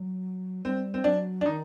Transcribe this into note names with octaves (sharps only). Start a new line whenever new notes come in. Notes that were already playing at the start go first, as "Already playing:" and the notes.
Already playing: F#3
G3 C4
C4
F#3 D4
D4
D#3 D#4